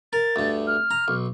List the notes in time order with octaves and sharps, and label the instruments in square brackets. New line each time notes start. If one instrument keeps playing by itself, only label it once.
[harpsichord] A#4 [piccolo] A6
[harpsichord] D2 G2
[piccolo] F6
[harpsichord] A#5
B1